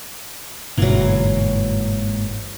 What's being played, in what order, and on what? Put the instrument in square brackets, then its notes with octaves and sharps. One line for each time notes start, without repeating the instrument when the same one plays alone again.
[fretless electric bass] G1 B2 D3 [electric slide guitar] G#2 A#3 [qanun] E3 F#3